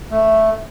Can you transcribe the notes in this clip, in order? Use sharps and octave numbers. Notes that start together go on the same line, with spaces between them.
A3